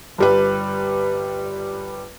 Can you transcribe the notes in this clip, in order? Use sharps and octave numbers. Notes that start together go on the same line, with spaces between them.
G1 G3 B4